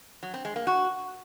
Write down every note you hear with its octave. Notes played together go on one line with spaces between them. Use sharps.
F#3
C4
G#3
A#3
F#4